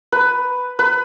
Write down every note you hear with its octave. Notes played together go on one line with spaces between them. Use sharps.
B4
B4